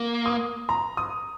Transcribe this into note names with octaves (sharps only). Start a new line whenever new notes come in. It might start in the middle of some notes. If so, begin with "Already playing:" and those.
Already playing: A#3
D#6
A#5
D#6